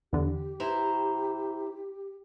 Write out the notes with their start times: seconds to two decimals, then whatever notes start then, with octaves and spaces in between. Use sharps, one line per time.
0.13 E2 D3 G4
0.60 E4 C5 A#5